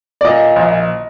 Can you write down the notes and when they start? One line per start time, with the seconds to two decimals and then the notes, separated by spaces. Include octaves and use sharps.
0.21 D5
0.24 A#2 D#5
0.56 A#1